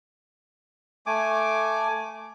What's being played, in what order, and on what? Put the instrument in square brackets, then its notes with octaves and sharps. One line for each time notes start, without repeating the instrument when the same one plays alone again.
[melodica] A3 G#5 D6